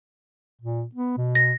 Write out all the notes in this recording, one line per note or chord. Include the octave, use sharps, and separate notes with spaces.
A#2
B3
B2
A#6